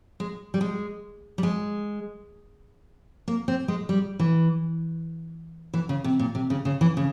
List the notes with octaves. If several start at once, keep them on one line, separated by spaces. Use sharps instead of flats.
G#3
G3
G#3
G3
G#3
A#3
C4
G#3
G3
E3
E3
C#3
C3
A#2
C3
C#3
C#3
E3
C#3